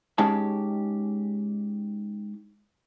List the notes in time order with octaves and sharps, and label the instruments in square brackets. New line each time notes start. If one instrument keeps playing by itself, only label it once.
[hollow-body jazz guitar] G#3 C#4 D#4 G4 G#4 A5